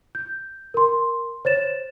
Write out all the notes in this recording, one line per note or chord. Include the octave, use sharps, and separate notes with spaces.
G6
A#4 C6
C5 C#5 A6 E7